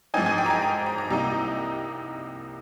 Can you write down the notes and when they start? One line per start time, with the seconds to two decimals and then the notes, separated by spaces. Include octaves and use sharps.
0.14 G#2 F3 C4 D#4 G#5
0.26 G#5
0.38 G5
0.46 A#5
0.50 G#5
0.62 A#5
0.86 A#5
0.98 A#5
1.10 C2 C3 G3 A#3 D#4 A#5